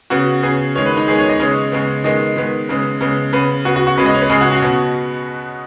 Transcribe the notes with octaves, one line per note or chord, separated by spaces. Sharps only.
C#3 B3 F#4
C#3 B3 G#4
D#3 G#3 B3 C#5
B4
D#4
D#3 G#3 B3 G#4
C#5
D#5
C#3 G#3 B3 C#5
C#3 G#3 B3
D#3 G#3 B3 D#5
D#3 G#3 B3
C#3 G#3 B3
C#3 G#3 B3
C#3 B3 B4
C#3 B3 F#4
F#4
F#4
C#3 G#3 B3 B4
D#5
C#5
B4
C#3 G#3 B3 G#4
F#4
F#4
B2 B3